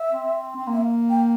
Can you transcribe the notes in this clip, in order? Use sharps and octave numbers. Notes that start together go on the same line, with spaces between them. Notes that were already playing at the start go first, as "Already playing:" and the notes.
Already playing: E5
C4
C4
A#3
E5
F5
G5